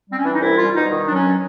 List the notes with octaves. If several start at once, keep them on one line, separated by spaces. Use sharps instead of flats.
G3 C4
C#4
E3 D4
D#4
C2 E4
G3 F4
B2 D#4
D#3
F#3 D4
C#4